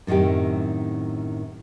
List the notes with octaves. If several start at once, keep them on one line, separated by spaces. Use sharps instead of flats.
F#2 A2 D#3 C4 G4